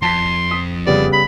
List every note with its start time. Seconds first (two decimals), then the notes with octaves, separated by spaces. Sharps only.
0.02 F2 A5 C6 B6
0.51 D#6 B6
0.87 C#3 G3 B3 D5
1.13 B5